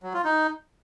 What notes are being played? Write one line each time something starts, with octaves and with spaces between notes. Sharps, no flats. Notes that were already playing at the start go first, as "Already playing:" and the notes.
F#3
F4
D#4